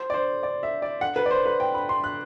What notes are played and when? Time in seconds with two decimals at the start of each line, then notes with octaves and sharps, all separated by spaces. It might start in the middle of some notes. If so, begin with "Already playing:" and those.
Already playing: C5
0.10 D5
0.14 C5
0.43 D5
0.63 E5
0.82 D5
1.01 F#5
1.16 B4
1.26 D5
1.31 C5
1.46 B4
1.60 G5
1.74 B5
1.89 C6
2.04 F#6